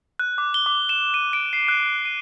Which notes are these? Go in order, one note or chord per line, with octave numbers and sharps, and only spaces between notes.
F#6
D6
G7
D6
E7
D#7
D7
C7
F#6
C7
D#7